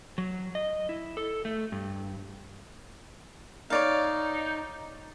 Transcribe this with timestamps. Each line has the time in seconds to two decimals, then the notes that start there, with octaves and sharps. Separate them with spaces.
0.18 F#3
0.55 D#5
0.89 E4
1.17 A4
1.45 A3
1.72 G2
3.70 D#4 C#5 D5 F5